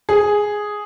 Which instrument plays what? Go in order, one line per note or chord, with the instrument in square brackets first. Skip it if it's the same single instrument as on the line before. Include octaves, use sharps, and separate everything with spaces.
[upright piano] G#4